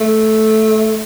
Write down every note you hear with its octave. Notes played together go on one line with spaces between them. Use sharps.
A3